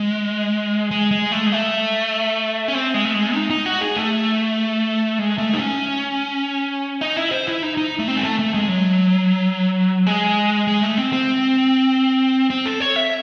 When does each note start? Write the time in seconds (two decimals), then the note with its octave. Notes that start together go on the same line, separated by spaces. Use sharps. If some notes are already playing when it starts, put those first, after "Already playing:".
Already playing: G#3
0.91 G#3
1.11 G#3
1.32 A3
1.46 G#3
1.52 A3
2.68 C#4
2.75 C4
2.94 G#3
3.05 A3
3.15 G#3
3.35 D#4
3.50 D#4
3.66 F#4
3.81 G#4
3.96 A3
5.19 G#3
5.38 A3
5.53 D#4
5.59 C#4
7.01 D#4
7.16 E4
7.31 C5
7.47 E4
7.63 D#4
7.77 D#4
7.99 A3
8.08 C4
8.16 G#3
8.23 A3
8.39 A3
8.54 G#3
8.69 F#3
10.07 G#3
10.67 G#3
10.82 A3
10.98 C4
11.13 C4
12.50 C4
12.66 A4
12.80 C#5
12.96 E5